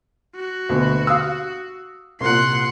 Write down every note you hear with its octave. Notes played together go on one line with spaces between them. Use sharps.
F#4
D2 B2
F5 D#6 E6
C2 A#2 F#5 C6